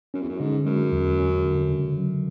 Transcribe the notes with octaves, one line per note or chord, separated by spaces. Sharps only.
F#2 C#4
E2
F#2
G#2 D3
F#2 G#3
E2
C#4
D3
C#3
F#3